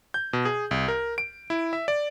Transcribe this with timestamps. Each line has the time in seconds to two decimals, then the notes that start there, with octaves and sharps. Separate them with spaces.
0.14 G6
0.33 B2
0.45 G#4
0.71 C2
0.88 A#4
1.18 D7
1.50 E4
1.73 E5
1.88 D5